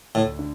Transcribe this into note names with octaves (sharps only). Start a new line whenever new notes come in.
D2 A2
D3